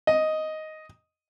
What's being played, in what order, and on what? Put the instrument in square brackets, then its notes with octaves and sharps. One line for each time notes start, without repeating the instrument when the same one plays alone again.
[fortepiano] D#5